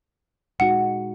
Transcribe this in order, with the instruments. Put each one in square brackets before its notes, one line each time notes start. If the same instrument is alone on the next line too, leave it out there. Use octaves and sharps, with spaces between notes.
[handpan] A#2 G#3 D#4 F#4 [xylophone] F#5